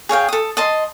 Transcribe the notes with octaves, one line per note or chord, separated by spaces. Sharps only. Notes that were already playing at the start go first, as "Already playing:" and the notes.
G#4 C#5 F5 G5
A4 D#6
D#5 A5 C6